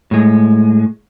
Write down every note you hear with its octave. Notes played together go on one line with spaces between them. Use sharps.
A2 G#3